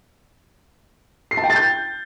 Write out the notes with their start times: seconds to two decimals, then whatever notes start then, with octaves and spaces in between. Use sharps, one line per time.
1.31 C7
1.37 A5
1.44 G5
1.50 A6
1.56 G6